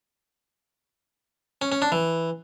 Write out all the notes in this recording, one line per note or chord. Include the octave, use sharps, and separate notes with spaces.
C#4
C#4
D4
E3